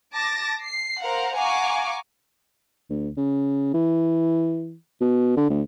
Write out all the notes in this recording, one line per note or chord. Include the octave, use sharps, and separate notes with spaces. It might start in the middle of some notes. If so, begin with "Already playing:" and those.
A5 D6 A6 A#6
C7
A#4 C5 F5 F#5
F5 F#5 G#5 A#5 C#6 D6
D2
C#3
E3
B2
D3
D2